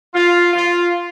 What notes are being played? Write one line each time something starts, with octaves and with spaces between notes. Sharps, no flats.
F4
F4